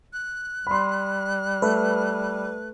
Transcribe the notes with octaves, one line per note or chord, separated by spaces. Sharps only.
F#6
G3 B5 C6
A3 B4